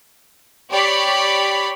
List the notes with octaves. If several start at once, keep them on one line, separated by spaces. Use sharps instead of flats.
G4 C#5 D5 B5